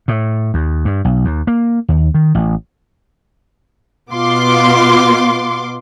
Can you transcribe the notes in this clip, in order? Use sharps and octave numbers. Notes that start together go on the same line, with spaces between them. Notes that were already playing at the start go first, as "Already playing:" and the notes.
A2
D#2
G2
B1
D#2
A#3
D#2
D#3
A1
B2 B3 F4 C6 D6